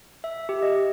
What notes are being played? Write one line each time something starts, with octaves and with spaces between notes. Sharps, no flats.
E5
G4
D#5